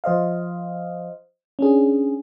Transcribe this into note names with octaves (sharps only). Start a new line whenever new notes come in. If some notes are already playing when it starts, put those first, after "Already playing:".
F3 C5 D#5 F5
C#4 D4 G#4